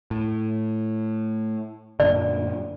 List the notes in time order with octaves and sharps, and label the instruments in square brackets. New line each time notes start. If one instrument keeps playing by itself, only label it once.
[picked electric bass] A2
[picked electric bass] F#2 A#2 D3 [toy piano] D5